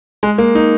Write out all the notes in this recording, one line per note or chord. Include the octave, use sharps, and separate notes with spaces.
G#3
A#3
D#4